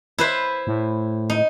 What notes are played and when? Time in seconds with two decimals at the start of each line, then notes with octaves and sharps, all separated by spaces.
0.18 E4 B4 C5
0.67 A2
1.30 D#4